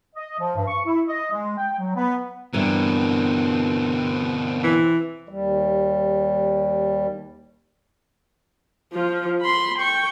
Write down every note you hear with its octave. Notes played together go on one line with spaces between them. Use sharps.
D#5
F3
G2
C#6
E4
D#5
G#3
G5
F#3
B3
E2 G2 B2 D3 C4 A#4
E3
D#2 G3
F3 F4
B5 C6
G5 C#6